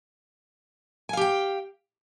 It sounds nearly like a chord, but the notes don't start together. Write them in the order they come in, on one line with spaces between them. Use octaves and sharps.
G#5 F5 G4 G5